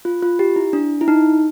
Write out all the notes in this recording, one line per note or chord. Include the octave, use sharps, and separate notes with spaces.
F4
F4
G4
E4
D4
E4
D#4